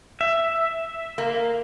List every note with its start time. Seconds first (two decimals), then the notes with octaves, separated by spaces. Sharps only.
0.21 E5
1.18 A#3